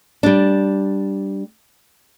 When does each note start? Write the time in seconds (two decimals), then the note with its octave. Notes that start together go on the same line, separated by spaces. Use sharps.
0.23 G3 D4